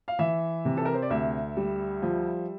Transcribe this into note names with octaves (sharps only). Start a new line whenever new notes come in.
F5
E3 E5
C3
A4
A#4
C5
D5
D2 E5
G3
F3